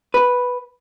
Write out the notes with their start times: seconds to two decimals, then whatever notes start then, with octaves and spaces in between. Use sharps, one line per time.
0.14 B4